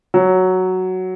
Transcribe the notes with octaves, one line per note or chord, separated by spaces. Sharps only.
F#3